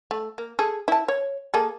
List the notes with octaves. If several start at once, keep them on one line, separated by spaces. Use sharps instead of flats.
A3
A#3
G#4 A4
E4 A5
C#5
A#3 G#4 A4